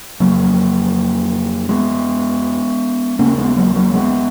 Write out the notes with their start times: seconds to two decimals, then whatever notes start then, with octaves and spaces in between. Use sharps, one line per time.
0.20 F2 C#3 F#3 A#3
1.69 G#3 B3
3.19 D#2 C#3 A#3 C#4
3.38 G#3 B3
3.56 F#3 A#3
3.75 F#3 A#3
3.94 G#3 B3